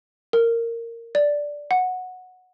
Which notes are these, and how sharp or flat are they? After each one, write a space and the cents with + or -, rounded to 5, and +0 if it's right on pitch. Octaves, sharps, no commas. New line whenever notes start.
A#4 -15
D5 -5
F#5 -10